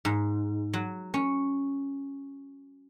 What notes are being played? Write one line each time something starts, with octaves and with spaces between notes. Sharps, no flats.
G#2
F#3
C#4